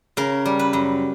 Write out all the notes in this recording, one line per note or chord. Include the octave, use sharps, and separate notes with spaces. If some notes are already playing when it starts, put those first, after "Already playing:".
C#3 A#4
G3
B4
F#2